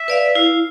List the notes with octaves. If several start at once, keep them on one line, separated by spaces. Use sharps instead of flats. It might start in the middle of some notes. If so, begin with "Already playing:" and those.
Already playing: E5
B4 D5 F5
E4 F5